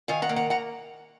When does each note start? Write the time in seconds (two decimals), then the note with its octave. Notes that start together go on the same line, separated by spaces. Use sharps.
0.08 D#3 F5 G#5
0.22 F#5 A#5
0.29 A#3
0.36 F#5 A#5
0.50 F#5 A#5